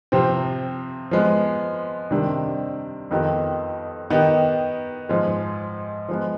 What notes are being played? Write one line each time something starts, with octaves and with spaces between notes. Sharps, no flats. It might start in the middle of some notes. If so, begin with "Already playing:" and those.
C3 F3 C4 G4
F3 G#3 B3
C3 D#3 G3 D4
F2 D#3 B3 D#4 G4
D#3 B3 D#4 G4
G#2 F3 G#3
F3 G#3 B3